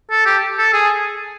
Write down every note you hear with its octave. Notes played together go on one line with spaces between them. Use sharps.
A4
G4
A4
G#4